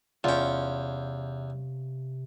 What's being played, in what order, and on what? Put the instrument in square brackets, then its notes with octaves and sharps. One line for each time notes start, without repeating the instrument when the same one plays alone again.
[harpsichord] E2 G5 [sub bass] C3 [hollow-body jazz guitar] C#4 F4